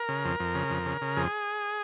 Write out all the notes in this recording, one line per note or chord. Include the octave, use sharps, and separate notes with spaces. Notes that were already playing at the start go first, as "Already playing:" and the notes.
Already playing: A#4
C#3
F2
F2
C#3
F2
C#3
C#3
F2 G#4